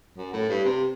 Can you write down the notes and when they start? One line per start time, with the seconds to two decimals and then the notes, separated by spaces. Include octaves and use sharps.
0.17 F#2
0.33 A2
0.49 G2
0.65 C3